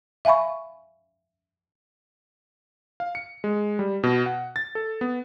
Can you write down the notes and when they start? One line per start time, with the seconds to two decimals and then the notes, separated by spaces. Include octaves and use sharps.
0.25 E5 F5 G#5 B5 C#6
3.00 F5
3.15 C#7
3.44 G#3
3.79 G3
4.03 B2
4.26 F#5
4.56 A6
4.75 A4
5.01 B3